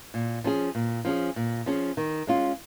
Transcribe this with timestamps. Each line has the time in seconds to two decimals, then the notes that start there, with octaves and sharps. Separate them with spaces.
0.14 A#2
0.44 F3 C#4 G#4
0.75 A#2
1.05 F3 C#4 G#4
1.36 A#2
1.66 F3 C#4 G#4
1.97 D#3
2.27 G#3 C#4 F4